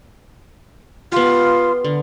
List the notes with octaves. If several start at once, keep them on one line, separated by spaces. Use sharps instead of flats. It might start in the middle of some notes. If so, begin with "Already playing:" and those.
B3 F4 G4
D3